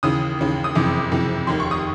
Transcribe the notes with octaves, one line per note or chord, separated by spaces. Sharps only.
D#2 C#3 E3 D#6
D#2 C#3 E3
D#6
F#1 F2 C3 E3 D6
F#1 F2 C3 E3
F1 D#2 D#3 C6
C#6
D#6